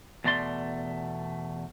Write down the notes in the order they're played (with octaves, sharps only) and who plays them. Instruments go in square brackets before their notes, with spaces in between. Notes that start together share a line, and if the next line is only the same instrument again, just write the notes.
[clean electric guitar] E2 B2 A3 D5 C6